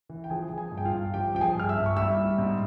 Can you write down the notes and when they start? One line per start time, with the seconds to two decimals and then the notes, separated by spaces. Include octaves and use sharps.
0.09 E3
0.24 G5
0.30 F3 G#4 G#5
0.51 F3
0.58 G#4 G#5
0.72 G2
0.78 G5
0.85 F4 F5
0.93 G2
1.14 F3 G4 G5
1.35 F3 G5
1.41 G#4 G#5
1.56 G2 F6
1.69 E5 E6
1.77 G2
1.86 C#6
1.97 G3 E5 E6
2.17 G3
2.38 G#2